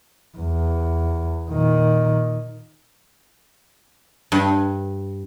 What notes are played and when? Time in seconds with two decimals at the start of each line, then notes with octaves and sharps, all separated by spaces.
0.38 E2
1.50 A#2 D#3
4.32 G2